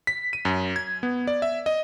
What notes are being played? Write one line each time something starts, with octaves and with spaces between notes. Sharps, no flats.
B6
D#7
F#2
G#6
B3
D5
E5
D#5